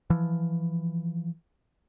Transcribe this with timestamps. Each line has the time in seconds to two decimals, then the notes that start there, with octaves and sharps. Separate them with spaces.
0.10 E3 F3